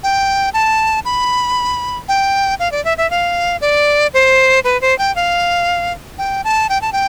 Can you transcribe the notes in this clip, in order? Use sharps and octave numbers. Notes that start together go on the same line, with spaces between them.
G5
A5
B5
G5
F5
D5
E5
E5
F5
D5
C5
B4
C5
G5
F5
G5
A5
G5
A5
G5